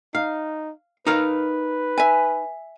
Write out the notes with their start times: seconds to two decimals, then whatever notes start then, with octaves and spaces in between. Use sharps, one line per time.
0.15 D#4 F5
1.07 D#4 A#4 B4 F5
1.98 E5 G#5